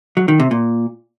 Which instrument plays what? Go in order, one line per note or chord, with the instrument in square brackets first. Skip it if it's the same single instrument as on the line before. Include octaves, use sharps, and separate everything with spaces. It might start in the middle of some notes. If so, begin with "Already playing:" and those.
[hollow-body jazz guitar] F#3
D#3
C3
A#2